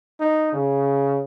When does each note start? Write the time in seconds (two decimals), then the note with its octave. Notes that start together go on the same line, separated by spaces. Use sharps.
0.20 D#4
0.53 C#3